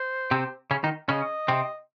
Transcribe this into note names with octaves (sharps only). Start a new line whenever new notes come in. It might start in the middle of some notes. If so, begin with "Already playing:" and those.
Already playing: C5
C3 C4
C#3 C#4
D#3 D#4
C#3 C#4 D#5
C3 C4